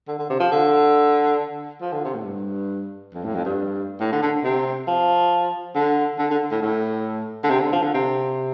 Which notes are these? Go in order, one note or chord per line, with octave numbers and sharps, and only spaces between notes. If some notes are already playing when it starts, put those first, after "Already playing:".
D3
D3
C3
F3
D3
F3
D3
C3
A2
G2
F2
A2
F2
G2
A2
D3
D3
C3
F3
D3
D3
D3
A2
A2
D3
C3
D3
F3
D3
C3